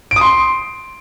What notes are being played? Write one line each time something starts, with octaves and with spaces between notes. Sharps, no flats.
D7
D#6
C6